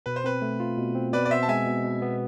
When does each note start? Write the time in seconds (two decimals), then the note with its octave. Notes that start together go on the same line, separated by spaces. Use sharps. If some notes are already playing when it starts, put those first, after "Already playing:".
0.06 B2 B4
0.16 C5
0.24 C4 B4
0.42 A3
0.60 F4
0.77 B2
0.95 C4
1.13 B2 B4 D5
1.25 D5
1.31 B3 C5 E5
1.43 A5
1.49 G#3 E5 G#5
1.66 B2
1.84 B2
2.02 B3